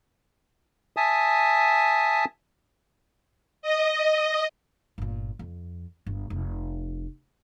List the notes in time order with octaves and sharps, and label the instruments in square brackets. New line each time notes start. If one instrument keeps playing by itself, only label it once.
[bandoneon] E5 G#5 A5 D#6
[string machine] D#5
[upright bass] G1 A#2
F2
G1
F1